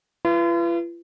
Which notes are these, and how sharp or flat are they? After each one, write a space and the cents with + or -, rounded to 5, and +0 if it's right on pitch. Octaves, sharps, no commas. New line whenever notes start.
F4 -45 B4 +0